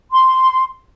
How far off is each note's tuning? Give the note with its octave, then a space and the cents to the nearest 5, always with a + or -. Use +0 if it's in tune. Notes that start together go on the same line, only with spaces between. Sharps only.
C6 -5